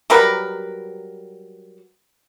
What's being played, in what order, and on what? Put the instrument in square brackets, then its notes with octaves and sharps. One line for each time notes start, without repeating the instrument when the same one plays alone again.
[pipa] F#3 G3 A#4 B4